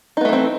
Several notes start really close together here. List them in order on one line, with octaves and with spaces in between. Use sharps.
D#4 B3 A3 E3 C4